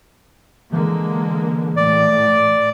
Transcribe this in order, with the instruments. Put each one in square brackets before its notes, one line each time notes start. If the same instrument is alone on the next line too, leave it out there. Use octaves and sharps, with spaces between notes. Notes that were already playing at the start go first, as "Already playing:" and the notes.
[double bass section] D3 G#3 A#3 [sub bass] E3
[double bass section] A2 [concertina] D5